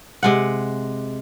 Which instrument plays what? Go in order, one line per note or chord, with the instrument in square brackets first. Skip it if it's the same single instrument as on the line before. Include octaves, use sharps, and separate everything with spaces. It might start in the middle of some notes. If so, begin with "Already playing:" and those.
[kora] C3 G#3 F#5